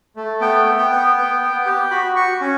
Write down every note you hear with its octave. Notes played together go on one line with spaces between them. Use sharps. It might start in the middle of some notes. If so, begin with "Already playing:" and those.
A3
B3 G5
B3
G5
B3
B3
B3
G4
F#4 B5
F#4 C#6
C#4